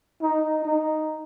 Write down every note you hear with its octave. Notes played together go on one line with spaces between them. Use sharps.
D#4
D#4